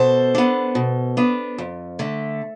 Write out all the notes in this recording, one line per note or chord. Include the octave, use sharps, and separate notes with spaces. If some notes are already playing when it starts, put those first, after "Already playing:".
Already playing: B2 A4 C5
B3 D4
B2
B3 D4
F2
D3 A3